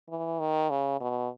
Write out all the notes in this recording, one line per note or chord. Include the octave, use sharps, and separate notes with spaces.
E3
D#3
C#3
B2